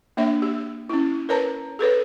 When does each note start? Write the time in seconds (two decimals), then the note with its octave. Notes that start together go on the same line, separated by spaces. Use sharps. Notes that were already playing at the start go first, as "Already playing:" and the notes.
0.17 A#3 D4 C#5 E5
0.42 G4
0.89 C#4 E4
1.29 A#4 B4 C#5 A5 A#5
1.79 G#4 A4 B4 C#5